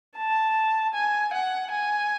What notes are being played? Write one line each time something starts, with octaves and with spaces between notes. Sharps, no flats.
A5
G#5
F#5
G#5